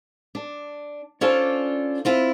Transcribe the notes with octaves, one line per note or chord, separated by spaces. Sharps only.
D4
C#4 D4 F4 A4 C5 D5
C4 E4 F4